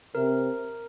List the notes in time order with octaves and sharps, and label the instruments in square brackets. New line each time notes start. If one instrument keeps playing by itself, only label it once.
[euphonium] C3 [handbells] A#4